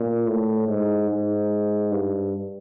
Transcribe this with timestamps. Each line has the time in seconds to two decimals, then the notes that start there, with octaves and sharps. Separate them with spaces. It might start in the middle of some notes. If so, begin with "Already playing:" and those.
Already playing: A#2
0.27 A2
0.68 G#2
1.09 G#2
1.92 G2